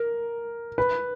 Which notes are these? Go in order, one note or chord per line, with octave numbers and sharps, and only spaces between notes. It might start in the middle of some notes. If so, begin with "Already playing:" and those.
Already playing: A#4
B4